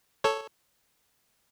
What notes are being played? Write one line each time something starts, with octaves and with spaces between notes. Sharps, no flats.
A4 C#5